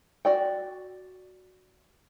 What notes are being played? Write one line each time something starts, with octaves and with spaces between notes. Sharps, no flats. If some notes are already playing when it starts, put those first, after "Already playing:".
F#4 D5 G5